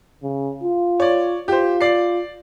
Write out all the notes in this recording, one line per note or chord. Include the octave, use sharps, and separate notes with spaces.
C#3
F4
C#5 D5
F4 G4 C5
D5 C7